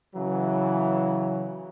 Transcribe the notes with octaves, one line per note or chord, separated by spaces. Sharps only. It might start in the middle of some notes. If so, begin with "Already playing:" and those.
C#3 E3 F#3